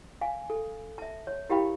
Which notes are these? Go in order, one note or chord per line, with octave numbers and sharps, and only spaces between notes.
F5 G#5
A4
E5 A5
C#5
E4 G4 A#4 F5 G5 B5